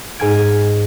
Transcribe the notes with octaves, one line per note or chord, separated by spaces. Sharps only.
G#2 G#5 F6 G#6 D7